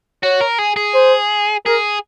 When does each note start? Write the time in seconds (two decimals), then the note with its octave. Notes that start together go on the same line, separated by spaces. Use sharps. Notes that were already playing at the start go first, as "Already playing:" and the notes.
0.23 F#4 C#5
0.41 A#4
0.58 G#4
0.76 G#4
0.94 C5
1.66 G#4 A#4